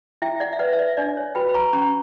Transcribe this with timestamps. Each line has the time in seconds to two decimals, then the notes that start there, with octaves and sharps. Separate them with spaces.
0.22 E4 E5 G5
0.40 D5 F#5
0.53 E5
0.59 B4 D5 F#5
0.73 E5
0.79 D5
0.97 D4 D5
1.17 C#5
1.35 F#4 B4 G5 B5
1.49 B5
1.54 A#5 C#6
1.73 C#4 A#5 C#6